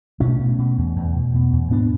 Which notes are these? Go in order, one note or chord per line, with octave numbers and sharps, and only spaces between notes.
B2 A3 C#4
B2
B2
E2
E2
B2
B2
E2
G#2 B3 D4